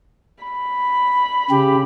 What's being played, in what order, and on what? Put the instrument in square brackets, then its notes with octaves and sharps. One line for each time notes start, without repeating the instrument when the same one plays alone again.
[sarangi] B5
[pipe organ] C#3 G4